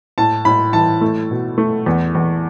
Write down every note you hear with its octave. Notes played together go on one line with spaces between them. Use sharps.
A2 A5
A2 B5
E3 A5
A3
B2
A3
E2
E2